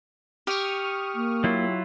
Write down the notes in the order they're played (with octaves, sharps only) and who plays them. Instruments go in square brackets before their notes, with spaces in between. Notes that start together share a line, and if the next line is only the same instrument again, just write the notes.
[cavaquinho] G4 [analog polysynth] C#6 D#6 F6
[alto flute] A#3
[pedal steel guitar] F#3 E4 F4